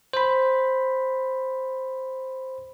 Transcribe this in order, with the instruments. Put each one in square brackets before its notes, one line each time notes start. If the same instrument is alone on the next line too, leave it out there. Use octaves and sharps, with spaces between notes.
[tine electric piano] C5 B5